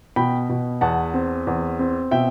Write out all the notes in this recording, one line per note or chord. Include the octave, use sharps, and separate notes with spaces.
B2 G5 B5
B2
E2 F#5 A5
C4
E2
C4
B2 E5 G5